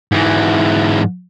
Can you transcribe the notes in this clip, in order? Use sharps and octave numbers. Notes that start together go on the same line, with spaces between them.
G#2 E3